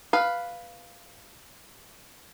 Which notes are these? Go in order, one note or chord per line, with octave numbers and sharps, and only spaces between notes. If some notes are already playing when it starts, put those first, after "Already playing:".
B4 F5